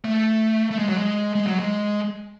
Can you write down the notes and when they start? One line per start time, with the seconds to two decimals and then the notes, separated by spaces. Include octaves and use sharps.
0.04 A3
0.71 A3
0.79 G#3
0.89 F#3
0.98 G#3
1.35 G#3
1.47 F#3
1.59 G#3